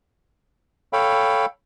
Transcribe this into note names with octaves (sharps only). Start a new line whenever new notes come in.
A4 C#5 F5 G5 B5